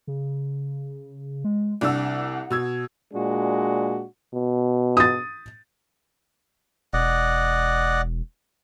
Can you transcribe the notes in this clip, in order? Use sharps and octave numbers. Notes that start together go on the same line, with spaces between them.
C#3
G#3
C2 D4 F#5 E6
B2 E6 G#6
A#2 G#3 D4 F#4
B2
D#6 A6
E1 D5 D#5 F#5